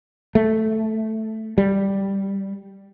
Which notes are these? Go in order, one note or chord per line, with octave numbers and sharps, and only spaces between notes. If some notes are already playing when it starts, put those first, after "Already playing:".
A3
G3